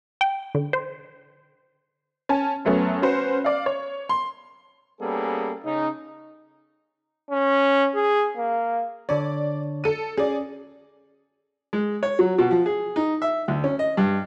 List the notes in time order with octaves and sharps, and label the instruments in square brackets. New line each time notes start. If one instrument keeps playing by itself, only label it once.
[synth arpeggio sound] G5
D3
C5
[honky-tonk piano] C#4 G#5 A5
F#2 F#3 A3 B3 C#4
C#4 F#4 B4 C5
D5 F5
C#5
C6
[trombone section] G3 A#3 B3 C#4 G#4 A4
C#3 D#4
[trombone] C#4
G#4
A#3
[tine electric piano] D3 D4 C#5 [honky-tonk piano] D5
[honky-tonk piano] A4 D#7
[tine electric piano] C#4 [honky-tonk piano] G#4 D5
[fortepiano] G#3
C#5
F#3
B2
F3
G#4
D#4
E5
D2
C#4
D#5
G2